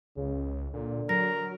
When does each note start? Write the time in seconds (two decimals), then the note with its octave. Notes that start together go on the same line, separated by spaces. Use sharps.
0.17 C#2 C#3
0.73 A#2 D3
1.09 F#3 A#4 A#6